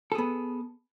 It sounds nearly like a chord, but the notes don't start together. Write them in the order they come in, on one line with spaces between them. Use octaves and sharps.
A4 G#4 B3